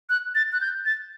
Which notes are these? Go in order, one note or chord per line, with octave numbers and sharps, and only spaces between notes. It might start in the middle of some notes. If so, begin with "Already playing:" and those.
F#6
A6
F#6
G6
A6